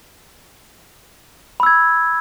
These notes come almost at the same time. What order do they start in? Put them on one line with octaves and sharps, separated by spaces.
B5 E6 G#6